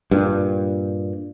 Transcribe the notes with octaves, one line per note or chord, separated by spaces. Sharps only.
G2 A#2